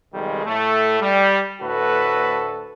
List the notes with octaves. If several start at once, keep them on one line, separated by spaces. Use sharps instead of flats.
B1 F2 D#3 G3 G#3
A2 A3
G3
D2 A2 F#4 A4 B4